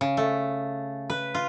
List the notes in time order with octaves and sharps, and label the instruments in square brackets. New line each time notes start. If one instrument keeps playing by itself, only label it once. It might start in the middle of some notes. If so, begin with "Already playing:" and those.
[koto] C#3
A3
B4
F4